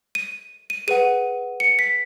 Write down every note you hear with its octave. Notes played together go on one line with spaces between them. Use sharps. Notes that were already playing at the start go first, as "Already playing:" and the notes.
D#7
D#7
G#4 B4 F#5 D#7
C#7
B6